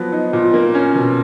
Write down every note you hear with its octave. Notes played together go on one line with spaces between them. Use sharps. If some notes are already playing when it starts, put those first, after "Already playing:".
Already playing: F3 F#3 B3
D#4
A#2
A#3
C#4
B2